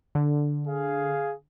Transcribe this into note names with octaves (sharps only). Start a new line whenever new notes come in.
D3
G#4 F5